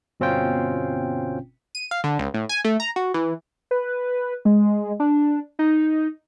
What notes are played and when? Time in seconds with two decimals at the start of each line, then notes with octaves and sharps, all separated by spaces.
0.20 G1 B2 C4 C#4 F4 G5
1.75 D#7
1.91 F5
2.04 D3
2.19 C#2
2.34 A2
2.49 G#5
2.65 A3
2.80 A#5
2.96 F#4
3.14 E3
3.71 B4
4.45 G#3
5.00 D4
5.59 D#4